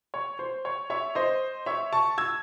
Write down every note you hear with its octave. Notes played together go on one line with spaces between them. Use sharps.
C#5
C5
C#5
C#5 E5
C5 D#5
C#5 E5
A5 C#6
E6 G#6